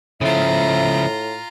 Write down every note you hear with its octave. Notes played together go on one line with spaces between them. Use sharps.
A2 C#3 F3 F4 E5 A#5